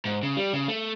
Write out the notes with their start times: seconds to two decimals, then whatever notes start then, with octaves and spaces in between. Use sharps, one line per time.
0.05 G#2
0.23 C#3
0.37 G3
0.53 C#3
0.68 A3